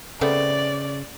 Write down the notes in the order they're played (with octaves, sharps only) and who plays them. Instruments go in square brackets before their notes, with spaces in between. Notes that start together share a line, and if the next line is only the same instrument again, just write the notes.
[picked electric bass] C#3 [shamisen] A3 B3 C4 [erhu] D5